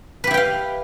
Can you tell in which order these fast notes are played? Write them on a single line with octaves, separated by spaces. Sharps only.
B4 G4 E4 G5 F5